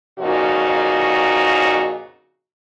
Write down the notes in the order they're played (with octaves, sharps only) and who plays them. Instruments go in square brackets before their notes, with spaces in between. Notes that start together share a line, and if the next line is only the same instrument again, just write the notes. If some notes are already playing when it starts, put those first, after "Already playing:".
[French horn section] F2 A#2 C#3 D#4 F#4 C#5